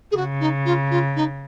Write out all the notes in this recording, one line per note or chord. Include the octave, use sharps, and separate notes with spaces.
G#4
C#3 F#4
D#4
F4
F4
D#4